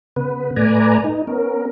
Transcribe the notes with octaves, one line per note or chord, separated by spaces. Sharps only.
C#3 B3 B4
A2 A3 B4 D5 G#5 A#5
D#4
B3 C#4 A#4